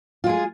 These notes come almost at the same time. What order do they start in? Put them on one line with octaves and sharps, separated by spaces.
F4 G#3 G#4